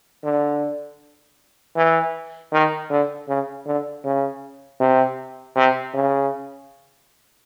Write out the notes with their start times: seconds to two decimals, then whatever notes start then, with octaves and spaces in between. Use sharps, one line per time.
0.24 D3
1.76 E3
2.52 D#3
2.90 D3
3.28 C#3
3.66 D3
4.04 C#3
4.80 C3
5.56 C3
5.94 C#3